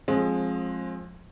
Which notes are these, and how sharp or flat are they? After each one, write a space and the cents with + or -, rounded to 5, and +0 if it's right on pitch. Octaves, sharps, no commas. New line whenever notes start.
F3 +20 G#3 +10 C4 +35